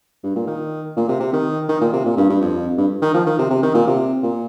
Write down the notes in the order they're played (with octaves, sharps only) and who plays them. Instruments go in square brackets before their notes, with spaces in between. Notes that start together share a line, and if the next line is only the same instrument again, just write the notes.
[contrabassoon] G2
A#2
D#3
A#2
C3
C3
D#3
D#3
A#2
C3
A#2
G2
G2
F2
G2
D#3
F3
D#3
C3
C3
D#3
A#2
C3
A#2